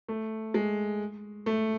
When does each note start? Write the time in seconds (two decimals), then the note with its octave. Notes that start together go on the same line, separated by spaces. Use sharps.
0.08 A3
0.54 G#3
1.46 A3